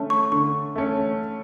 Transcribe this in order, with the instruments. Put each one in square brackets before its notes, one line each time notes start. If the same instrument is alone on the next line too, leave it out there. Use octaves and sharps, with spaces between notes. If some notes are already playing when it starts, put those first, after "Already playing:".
Already playing: [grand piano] D3 A3 C#4
[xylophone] C#6
[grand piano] D3 [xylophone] C#6
[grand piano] A3 C#4